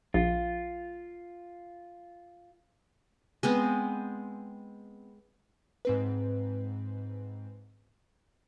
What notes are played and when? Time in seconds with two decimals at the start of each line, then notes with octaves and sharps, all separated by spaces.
0.14 A#1 F4
3.43 G#3 B3 C4
5.85 G#2 C4 B4